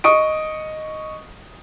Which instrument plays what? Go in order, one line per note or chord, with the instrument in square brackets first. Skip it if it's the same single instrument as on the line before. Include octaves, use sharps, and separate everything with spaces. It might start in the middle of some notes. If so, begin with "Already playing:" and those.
[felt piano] D#5 C#6 D#6 D7